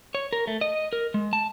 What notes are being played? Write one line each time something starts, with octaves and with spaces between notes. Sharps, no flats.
C#5
A#4
A3
D#5
A#4
G#3
A5